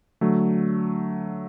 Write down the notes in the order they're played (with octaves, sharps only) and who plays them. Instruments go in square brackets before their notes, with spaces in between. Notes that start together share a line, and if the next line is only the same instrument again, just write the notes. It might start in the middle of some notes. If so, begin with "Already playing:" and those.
[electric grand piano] D3 F#3 A3